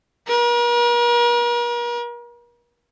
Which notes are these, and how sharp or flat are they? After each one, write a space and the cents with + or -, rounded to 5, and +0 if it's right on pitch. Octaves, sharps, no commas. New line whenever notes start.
A#4 +45